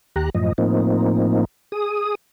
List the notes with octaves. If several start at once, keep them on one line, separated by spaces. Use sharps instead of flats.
D#2 G4 A#5 F#6
F#2 A2 F3 D#5
A2 F3 A#3 C4 D#4
G#4 D#6